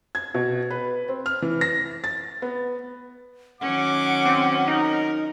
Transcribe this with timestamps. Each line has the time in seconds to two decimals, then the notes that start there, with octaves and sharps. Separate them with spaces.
0.15 G#6
0.34 B2
0.70 B4
1.09 C4
1.26 F6
1.42 E3
1.61 A#6
2.04 A6
2.42 B3
3.61 D#3 F#3 C#4 F#5 D6
4.26 C4
4.67 D#4 A#4